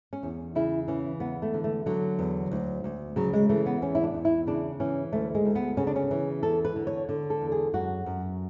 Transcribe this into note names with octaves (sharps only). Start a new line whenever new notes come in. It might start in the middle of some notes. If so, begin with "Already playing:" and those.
C#4
E2
C#3 E4
E3 C#4
E2 B3
A3
D3
A3
D3 F#3
E2
D2
D2
C#3 F#3
G#3
E3 A3
B3
E2 C#4
E4
D4
E2
E4
C#3 D4
E3 C#4
D2 A3
G#3
D2
B3
C#3 C#4
D4
C#4
E3
E2 A4
B4
D3
C#5
D3
A4
E2
G#4
F#2 F#4
F#2